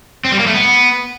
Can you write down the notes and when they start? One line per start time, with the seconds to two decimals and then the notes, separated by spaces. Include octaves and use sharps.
0.25 C4
0.32 G3
0.39 A#3
0.47 A3
0.54 B3